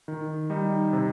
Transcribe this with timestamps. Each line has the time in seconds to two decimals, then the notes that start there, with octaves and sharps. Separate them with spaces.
0.08 D#3
0.50 G3 D#4
0.93 C3